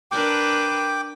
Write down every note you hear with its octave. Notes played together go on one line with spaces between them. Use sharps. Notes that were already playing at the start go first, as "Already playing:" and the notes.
D4 A#4 B4 G5 D6